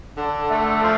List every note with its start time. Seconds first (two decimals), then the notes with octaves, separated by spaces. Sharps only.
0.17 D3
0.50 A3
0.82 F3